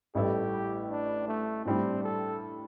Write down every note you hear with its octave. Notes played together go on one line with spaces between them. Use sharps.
A1 A2 G3 E4 G4 A4
D4
A3
A2 G3 C4 D4
A4